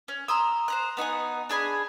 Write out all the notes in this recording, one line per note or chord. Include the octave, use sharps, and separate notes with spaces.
C#4
A#5 C6 D#6 E6
C5 A#5 F#6
B3 D#4 F#5 G#5
D4 G#4 G#5 B5